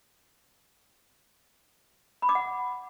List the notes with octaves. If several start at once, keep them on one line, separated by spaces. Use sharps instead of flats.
B5
D6
F#5